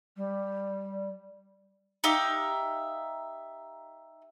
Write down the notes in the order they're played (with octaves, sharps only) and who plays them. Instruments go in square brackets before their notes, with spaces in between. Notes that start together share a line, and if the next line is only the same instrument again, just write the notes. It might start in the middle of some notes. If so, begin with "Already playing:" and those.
[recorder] G3
[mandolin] D#4 G4 E5 F5